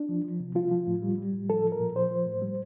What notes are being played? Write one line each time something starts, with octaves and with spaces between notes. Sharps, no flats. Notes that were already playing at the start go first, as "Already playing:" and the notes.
Already playing: D4
F3
F3
C3
F3 F4
F3
A2
G3
G3
A2
F3 A4
F3
A#4
A#2
F3 C5
F3
A2
G3